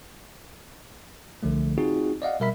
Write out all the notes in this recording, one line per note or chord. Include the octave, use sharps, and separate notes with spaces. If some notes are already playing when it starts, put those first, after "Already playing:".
C2 D3 F3 A3
C4 D#4 F4 F#4 G#4
D5 D#5 F5 F#5
B2 G3 A#4 E5 B5 B6